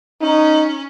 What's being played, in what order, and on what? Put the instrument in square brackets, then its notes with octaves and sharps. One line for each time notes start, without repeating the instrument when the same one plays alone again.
[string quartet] C#4 [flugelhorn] D#4